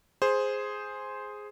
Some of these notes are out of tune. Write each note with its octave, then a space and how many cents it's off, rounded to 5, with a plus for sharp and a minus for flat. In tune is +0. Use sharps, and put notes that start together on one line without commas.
G#4 +0 C5 +0